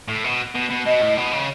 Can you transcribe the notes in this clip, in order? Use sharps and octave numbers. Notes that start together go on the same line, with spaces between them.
A2
B2
B2
B2
B2 D#5
A2
B2
C#3